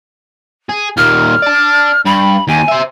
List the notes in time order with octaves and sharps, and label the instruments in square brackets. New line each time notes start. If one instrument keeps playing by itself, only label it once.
[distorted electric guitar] G#4
[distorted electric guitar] D#2 A#2 [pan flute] F6
[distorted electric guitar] D5 A5
[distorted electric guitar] G2 [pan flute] B5
[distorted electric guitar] D#2 [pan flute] G#5
[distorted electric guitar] C5 E5